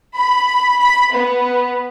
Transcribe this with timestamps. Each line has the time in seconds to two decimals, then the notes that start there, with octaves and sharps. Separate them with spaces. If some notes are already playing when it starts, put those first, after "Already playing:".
0.14 B5
0.78 B5
1.12 B3